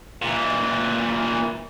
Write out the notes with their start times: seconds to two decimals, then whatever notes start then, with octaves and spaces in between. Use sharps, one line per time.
0.22 A#2 E3